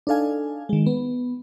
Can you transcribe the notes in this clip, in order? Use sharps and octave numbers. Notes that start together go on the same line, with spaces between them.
D4 D#4 A4 F5 G#5
D#3 G#3
B3